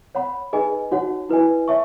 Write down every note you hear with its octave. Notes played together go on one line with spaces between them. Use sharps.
C#5 F#5 B5
D#4 G#4 B4 D#5 G#5
D#4 F#4 C#5 F#5
E4 B4 D#5 G#5
C#5 E5 A5 C#6